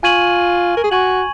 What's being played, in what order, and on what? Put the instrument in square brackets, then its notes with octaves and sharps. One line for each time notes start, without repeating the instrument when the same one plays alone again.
[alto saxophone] F4 [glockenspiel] G#5 C#6 G#6 D#7 F#7
[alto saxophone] A#4
G#4
[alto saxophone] F#4 [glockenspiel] G#5 C#6 G#6 D#7 F#7